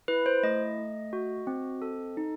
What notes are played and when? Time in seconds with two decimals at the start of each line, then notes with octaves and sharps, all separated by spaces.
0.08 E4 B4
0.26 C5
0.43 A3 D#5
0.78 A3
1.13 F#4
1.47 C4
1.82 A4
2.17 D#4